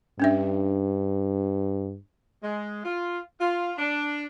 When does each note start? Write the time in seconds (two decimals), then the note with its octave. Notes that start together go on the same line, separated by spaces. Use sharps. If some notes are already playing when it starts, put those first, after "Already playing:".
0.20 G2 C#4 D4 E5
2.42 G#3
2.83 F4
3.40 F4
3.77 D4